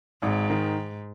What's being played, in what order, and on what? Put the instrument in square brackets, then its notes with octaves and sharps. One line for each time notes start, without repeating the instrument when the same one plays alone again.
[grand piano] G#1 [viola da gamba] G#2
[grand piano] D#3